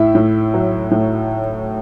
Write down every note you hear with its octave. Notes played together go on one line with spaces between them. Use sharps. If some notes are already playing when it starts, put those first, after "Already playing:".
Already playing: A2 E4 E5
A2
F#3
A2